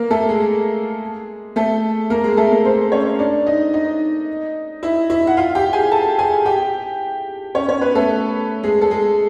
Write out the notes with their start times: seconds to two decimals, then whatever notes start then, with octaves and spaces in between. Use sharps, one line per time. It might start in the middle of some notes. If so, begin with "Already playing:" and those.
Already playing: A#3 A#4
0.10 A3 A4
0.29 G#3 G#4
1.56 A3 A4
2.10 A#3 A#4
2.24 G#3 G#4
2.37 A3 A4
2.51 A#3 A#4
2.64 C4 C5
2.92 C#4 C#5
3.19 D4 D5
3.46 D#4 D#5
3.74 D#4 D#5
4.83 E4 E5
5.10 E4 E5
5.27 F#5
5.37 F4 F5
5.55 G4 G5
5.73 G#4 G#5
5.91 A4 A5
6.19 G#4 G#5
6.46 G4 G5
7.55 C#4 C#5
7.69 C#4 C#5
7.81 B3 B4
7.95 A3 A4
8.63 G#3 G#4
8.81 A4
8.90 G#3 G#4